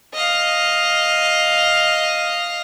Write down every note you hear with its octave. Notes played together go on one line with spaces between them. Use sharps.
D#5 F5